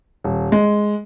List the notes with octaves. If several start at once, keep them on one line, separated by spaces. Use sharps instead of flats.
D#1
G#3